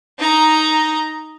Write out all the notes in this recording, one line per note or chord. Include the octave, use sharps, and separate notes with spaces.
D#4 A#5